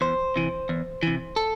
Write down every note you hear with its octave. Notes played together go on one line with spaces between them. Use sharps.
E2 C5
C3 E3
E2
C3 E3
A4